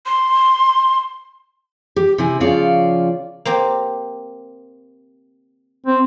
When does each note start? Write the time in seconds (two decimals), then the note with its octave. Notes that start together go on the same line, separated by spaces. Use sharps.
0.06 C6
1.96 G4
2.18 C3 C4 E4 G#5
2.40 C#3 F3 F4 C#5 D5 F5
3.45 A#3 C4 G4
5.87 C4